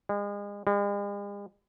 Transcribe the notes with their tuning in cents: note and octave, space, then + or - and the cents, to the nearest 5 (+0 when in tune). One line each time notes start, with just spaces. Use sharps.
G#3 -35
G#3 -45